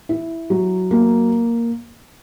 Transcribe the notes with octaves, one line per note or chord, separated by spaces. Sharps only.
E4
F#3
A#3